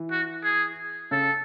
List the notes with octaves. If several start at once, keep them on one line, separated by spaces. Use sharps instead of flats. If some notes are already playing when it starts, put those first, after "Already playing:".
Already playing: E3
F#4
G#4
C#3 A4